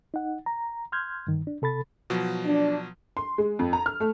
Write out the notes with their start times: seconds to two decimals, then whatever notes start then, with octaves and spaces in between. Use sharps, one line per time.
0.14 D#4 F#5
0.46 A#5
0.92 C6 F6 G6 G#6
1.27 G2 D#3
1.47 D4
1.62 C3 A4 B5 A6
2.10 B2 F3 F#3
2.45 D4
3.17 C6
3.38 G#3
3.59 F2
3.73 A#5
3.86 F6
4.00 A3